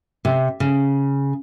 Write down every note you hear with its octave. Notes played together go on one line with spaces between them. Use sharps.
C3
C#3